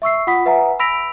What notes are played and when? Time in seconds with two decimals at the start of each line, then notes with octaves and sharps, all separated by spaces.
0.02 E5 C#6 E6 C7
0.27 F4 F#5 B5 D#6 B6
0.46 B4 E5 F#5 G#5 A#5
0.79 B5 E6 A#6 B6 D7 F7